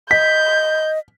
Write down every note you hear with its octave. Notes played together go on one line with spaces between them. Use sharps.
D#5 G6 B6